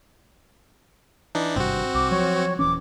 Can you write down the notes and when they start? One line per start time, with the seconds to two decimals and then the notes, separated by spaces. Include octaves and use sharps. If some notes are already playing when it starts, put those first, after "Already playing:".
1.35 E3 D4 D#4
1.56 G#1 G2 C3 C4 F#4
1.95 C2 D6
2.11 F3 F#3 C#5
2.59 D#1 E3 C#4 D6